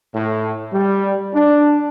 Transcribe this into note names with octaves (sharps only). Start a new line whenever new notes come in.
A2
G3
D4